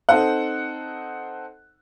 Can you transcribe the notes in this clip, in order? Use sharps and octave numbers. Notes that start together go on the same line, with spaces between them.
C4 D#4 A4 C5 F#5